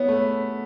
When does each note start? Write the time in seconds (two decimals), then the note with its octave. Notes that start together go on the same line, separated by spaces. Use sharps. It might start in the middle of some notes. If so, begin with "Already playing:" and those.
Already playing: B3 E4 G#4 C#5
0.09 A3